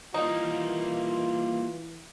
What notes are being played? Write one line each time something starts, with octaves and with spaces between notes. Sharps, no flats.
E3 G3 A#3 D#4 F4